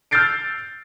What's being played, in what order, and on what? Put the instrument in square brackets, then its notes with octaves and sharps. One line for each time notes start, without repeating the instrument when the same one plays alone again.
[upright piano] E6 F6 G6 A6 C7 D7